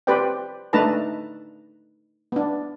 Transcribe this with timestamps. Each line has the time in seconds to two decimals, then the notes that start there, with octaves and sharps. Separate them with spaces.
0.07 C4 G4 B4 C5 D5 G5
0.73 A3 D4 D#4 B4 A5 A#5
2.32 B3 D4